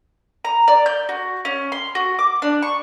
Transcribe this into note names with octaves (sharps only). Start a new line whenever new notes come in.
A#5
D5
G6
F#4
C#4
C6
F#4
D6
D4
C#6